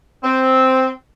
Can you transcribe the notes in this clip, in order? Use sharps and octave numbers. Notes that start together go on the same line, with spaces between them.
C4